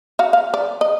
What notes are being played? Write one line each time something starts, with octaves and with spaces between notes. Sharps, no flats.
F#4 F5
F5
D5
D#5